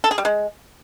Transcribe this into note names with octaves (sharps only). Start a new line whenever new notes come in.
A4
G#4
G3
G#3